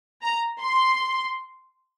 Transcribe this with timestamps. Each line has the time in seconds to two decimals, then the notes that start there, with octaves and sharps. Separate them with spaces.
0.23 A#5
0.62 C6